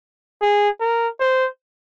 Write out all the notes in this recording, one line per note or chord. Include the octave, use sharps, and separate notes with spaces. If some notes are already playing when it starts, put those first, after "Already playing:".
G#4
A#4
C5